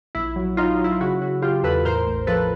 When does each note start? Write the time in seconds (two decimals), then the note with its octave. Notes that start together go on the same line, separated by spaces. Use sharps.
0.15 A#1 E4
0.36 F#3
0.57 F#3 D#4 F4
0.77 D#4
0.80 F#3 E4
0.92 F4
1.01 C#3 E4 F#4
1.21 C#3 E4 F#4
1.42 C#3 F4 G4
1.64 E2 A4 B4
1.85 A2 A#4 C5
2.07 A1
2.27 F3 A4 B4